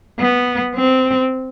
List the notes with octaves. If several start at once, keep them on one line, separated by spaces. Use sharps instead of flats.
B3
C4